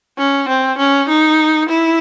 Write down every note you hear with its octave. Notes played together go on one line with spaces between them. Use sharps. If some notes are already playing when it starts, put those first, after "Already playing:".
C#4
C4
C#4
D#4
E4